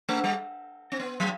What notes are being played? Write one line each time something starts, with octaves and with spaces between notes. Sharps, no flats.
A3
G3
C4
B3
F#3